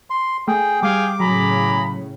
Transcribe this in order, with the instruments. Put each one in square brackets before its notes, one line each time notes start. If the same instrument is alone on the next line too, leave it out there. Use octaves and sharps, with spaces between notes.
[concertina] C6
[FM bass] A3 [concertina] G#4 G5
[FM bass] G3 [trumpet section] G#4 F5 G5 [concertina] D6
[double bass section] A2 C#3 [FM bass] F#3 [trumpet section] G#4 A#5 B5